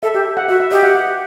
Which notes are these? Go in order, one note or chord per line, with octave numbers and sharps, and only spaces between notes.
A4 E5
G4 E5
F#5
F#4 E5
E5
G4 D#5
F#5
F#5